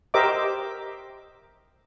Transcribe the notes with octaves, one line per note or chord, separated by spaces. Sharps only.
G4 A#4 C5 D#5 E5 D6